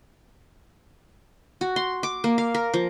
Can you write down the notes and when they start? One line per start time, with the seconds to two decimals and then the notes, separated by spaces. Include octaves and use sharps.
1.61 F#4
1.76 C6
2.03 D6
2.24 A#3
2.38 F5
2.54 A#4
2.74 F3